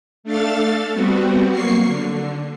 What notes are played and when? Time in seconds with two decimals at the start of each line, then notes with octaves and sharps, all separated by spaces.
0.24 A3 D4 A4 F5 A6
0.92 G3 B3 C4 F#4
1.50 F#3 A#3 C#6 C7
1.86 D3